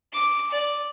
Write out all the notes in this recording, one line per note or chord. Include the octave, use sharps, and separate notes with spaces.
D6
D5